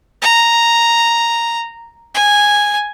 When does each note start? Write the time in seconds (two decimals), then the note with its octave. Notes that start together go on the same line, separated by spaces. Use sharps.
0.22 A#5
2.15 G#5